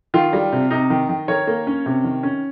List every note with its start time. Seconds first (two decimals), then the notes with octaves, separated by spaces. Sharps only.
0.14 D#3 F4
0.33 G3
0.52 C3
0.71 C3 D#4
0.90 D#3
1.09 D#3
1.28 D#3 A#4 C#5
1.47 A#3
1.67 C#4
1.86 C3
2.04 D#3
2.23 C#4